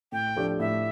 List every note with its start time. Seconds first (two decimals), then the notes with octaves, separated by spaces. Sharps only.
0.12 A2 G5
0.36 F3 A3 D4 G4
0.60 A2 E5